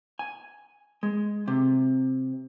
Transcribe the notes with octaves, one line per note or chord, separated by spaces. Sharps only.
G#5
G#3
C3